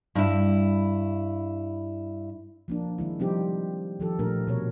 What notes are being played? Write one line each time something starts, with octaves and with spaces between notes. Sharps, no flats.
G2 E4
F3 A#3 D4
D#3 G#3 E4
C3 F3 G3 C4 D#4 G4
D#3 F3 G4 A4
A#2 F3 A3 D4 A#4
B2 A#4 C#5